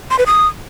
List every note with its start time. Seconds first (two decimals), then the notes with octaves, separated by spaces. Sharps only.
0.11 C6
0.19 B4
0.27 D#6